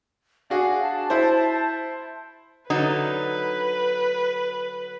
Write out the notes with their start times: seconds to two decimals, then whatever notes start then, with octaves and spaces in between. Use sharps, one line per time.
0.50 D4 F#4 G#4 F5
0.83 A5
1.10 E4 C5
2.70 D3 F#3 D#4 B4